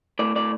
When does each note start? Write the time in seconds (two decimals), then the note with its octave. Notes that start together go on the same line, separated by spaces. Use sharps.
0.19 A2 D5
0.36 A2 D5